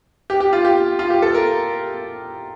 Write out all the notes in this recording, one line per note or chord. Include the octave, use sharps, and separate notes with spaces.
G4
G4
F4
G4
F4
G4
A4
A#4